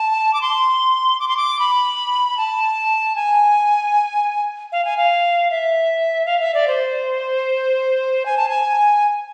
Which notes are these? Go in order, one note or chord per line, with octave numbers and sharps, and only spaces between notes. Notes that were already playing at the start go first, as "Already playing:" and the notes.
Already playing: A5
D6
C6
D6
C6
D6
B5
A5
G#5
F5
G#5
F5
E5
F5
E5
D5
C5
G#5
A5
G#5